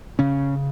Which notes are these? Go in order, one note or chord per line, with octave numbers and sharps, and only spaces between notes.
C#3 C#4